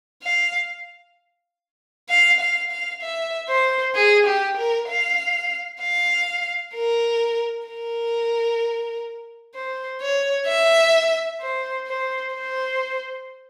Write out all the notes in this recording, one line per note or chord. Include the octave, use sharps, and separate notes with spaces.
F5
F5
F5
F5
E5
C5
G#4
G4
A#4
F5
F5
A#4
A#4
C5
C#5
E5
C5
C5
C5